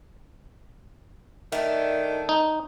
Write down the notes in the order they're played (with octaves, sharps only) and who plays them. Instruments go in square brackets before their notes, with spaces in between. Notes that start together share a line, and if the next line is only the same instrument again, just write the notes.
[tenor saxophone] D#3 [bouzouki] A3 D4
[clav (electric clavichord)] D#4